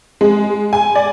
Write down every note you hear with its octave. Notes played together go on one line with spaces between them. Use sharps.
G#3
G#5
D5